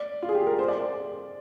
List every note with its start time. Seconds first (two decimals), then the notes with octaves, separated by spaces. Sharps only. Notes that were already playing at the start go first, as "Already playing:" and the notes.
Already playing: D5
0.23 F4
0.29 G#4
0.35 G4
0.47 A#4
0.59 C5
0.68 D5